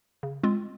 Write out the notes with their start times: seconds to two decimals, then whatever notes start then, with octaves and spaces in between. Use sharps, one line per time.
0.23 C#3
0.43 G#3 C4 F4